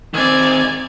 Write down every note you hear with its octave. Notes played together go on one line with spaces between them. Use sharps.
D#3 C4 D5 G#5